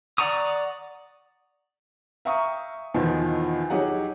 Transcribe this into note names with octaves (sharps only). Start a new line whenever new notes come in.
D5 F#5 A#5 C#6 D#6
E5 F5 G5 A#5 C#6 D#6
E2 B2 D#3 F3
F#3 D#4 G4 G#4 C#5 F#5